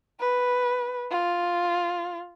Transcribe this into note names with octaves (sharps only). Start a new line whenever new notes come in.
B4
F4